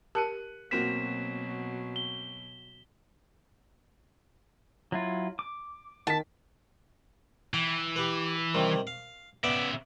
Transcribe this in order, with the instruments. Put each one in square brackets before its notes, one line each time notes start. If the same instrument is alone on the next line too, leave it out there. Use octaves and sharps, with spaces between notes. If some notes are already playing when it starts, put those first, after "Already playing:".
[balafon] G4 A#4 A5 [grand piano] F#6 C#7 D#7
[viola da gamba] B2 F#3 [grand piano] A#3 C4 F#4 [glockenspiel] B6 E7
[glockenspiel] G7
[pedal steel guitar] F#3 E4 F4
D6
[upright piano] D#3 B6 [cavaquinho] A5
[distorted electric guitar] E3 [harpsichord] G5
[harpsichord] G4 B4
C3 D#3 G3
F5
[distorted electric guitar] C#3 E5 [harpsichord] B3 D5 G5